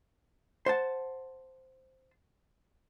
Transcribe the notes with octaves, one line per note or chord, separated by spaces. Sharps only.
C5 F#5 A5